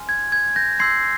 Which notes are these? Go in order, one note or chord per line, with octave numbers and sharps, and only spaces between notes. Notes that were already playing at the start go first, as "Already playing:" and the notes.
Already playing: G#5 C6 F6
G#6
G#6
G6 A#6
C6 E6 G6 G#6 C7